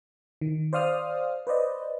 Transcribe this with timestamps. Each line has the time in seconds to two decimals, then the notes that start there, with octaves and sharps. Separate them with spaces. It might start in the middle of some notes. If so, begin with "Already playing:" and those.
0.41 D#3
0.73 C5 D5 F5 D#6 F6
1.47 B4 C5 D5 D#5